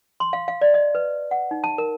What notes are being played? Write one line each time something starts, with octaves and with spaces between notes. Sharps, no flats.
C6
F5
F5
D5
D#5
B4
F#5
D#4
A5
A#4